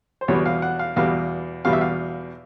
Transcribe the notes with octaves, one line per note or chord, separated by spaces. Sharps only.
C5
E2 B2 G3 C#5
F5
F#5
F5
E2 B2 G3 F5
E2 B2 G3 F5
E5
F5